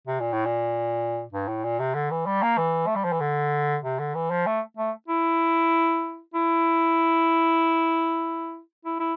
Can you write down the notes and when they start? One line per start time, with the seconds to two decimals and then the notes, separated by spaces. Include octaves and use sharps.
0.08 C3
0.20 A#2
0.33 A2
0.45 A#2
1.33 G2
1.48 A2
1.64 A#2
1.80 C3
1.95 D3
2.11 E3
2.26 G3
2.43 A#3
2.58 E3
2.87 A3
2.96 G3
3.05 F3
3.12 E3
3.21 D3
3.83 C3
3.99 D3
4.15 E3
4.31 F3
4.47 A3
4.77 A3
5.08 E4
6.34 E4
8.85 E4
9.00 E4